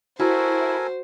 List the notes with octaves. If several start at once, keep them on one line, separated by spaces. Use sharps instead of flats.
E4 F#4 A4 A#4 C5 G#5